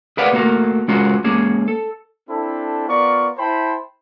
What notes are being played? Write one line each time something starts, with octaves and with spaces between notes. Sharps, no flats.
G#4 A#4 B4 D5 F5 F#5
A3 A#3 F#4 A4 A#4
G#3 C#4 F4 F#4 A#4
G#3 A#3 C#4 G#4
A4
C4 D4 E4 A4
B3 F4 A#4 D5 C#6
E4 C5 G5 A5 B5